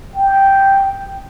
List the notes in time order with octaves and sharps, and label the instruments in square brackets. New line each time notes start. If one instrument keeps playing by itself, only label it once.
[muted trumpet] G5